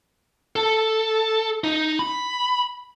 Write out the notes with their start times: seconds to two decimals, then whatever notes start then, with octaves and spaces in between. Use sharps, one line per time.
0.56 A4
1.64 D#4
1.99 B5